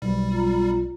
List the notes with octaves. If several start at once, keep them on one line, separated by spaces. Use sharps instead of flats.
B1 G3
F4 A#5